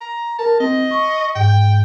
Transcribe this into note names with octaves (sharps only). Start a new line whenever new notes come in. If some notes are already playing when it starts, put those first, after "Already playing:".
A#5
A#4 A5
C4 D#5
C#6
G#2 G5